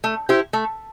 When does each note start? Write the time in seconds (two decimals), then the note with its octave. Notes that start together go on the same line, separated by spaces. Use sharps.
0.04 A3
0.29 E4 G4 C5
0.53 A3